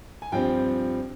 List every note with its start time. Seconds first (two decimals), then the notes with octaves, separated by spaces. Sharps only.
0.22 G#5
0.32 G2 F3 C4 G5